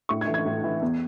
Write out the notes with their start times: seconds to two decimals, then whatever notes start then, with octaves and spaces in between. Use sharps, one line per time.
0.09 A2 C#6
0.21 G#6
0.27 E3
0.34 G#6
0.46 A2
0.64 E3
0.82 E2